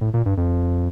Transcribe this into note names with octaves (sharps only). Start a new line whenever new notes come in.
A2
A#2
G2
F2